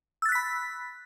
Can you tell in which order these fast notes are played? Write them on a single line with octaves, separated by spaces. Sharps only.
E6 A6 F#6 B6 B5